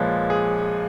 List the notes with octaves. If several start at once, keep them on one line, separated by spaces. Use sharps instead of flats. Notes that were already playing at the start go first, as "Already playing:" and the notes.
Already playing: A#1 A#2 F3 G#3 B4 C#5
G#4